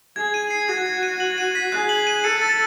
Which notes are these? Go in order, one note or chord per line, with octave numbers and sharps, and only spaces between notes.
G#4 G#6
D#7
C7
F#4 G#6
G#6
D#7
F#7
D#7
B6
G#4 F#6
F#7
D#7
A4 C#7
A6